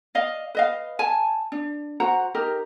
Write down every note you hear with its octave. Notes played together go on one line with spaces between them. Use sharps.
D5 D#5 F5
B4 D#5 F5
G#5 A5
D4
F#4 C5 F#5 A#5
D#4 G4 A#4